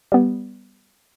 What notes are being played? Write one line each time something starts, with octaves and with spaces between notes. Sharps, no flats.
G3 B3